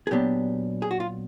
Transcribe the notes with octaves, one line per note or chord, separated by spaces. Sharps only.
G#4
A#2 F#3 B3 D4 G4
G#4
F#4
F4